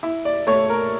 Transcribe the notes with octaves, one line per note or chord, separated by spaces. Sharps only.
E4
D5
A3 C#5
A#4